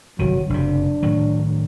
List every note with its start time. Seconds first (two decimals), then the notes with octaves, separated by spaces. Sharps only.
0.19 G1 C3 D#3 F#3
0.50 F#1 C3 D4
1.03 A2 D#3 F#3